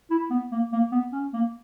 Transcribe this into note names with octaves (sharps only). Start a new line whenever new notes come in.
E4
B3
A#3
A#3
B3
C#4
A#3